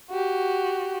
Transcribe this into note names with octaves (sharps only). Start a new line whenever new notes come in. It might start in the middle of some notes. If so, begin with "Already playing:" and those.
F#4 G4